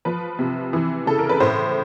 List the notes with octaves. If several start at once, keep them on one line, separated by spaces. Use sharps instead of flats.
F3 B4
C3
E3
C#3 A4
A#4
B4
A2 C5